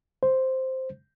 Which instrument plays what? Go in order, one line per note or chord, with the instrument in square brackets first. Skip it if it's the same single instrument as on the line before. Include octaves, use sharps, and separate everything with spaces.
[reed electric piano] C5